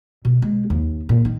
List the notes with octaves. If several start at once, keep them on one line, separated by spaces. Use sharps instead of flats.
B2
G#3
D#2
A#2
D#3